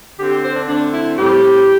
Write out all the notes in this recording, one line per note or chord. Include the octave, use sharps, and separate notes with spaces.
D3 C4 G4
G4
C5
D4
D3 A3 C4 D4
E4
A2 G3 C4 G4